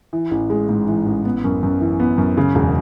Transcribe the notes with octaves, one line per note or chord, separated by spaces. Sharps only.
E3
A1
G#3
G#2
E3
A1
B3
F#2
F#2
E3
B3
F#2
C#3
E1